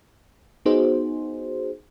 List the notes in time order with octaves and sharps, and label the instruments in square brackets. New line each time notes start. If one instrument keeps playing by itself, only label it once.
[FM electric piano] B3 D#4 F#4 G#4 C5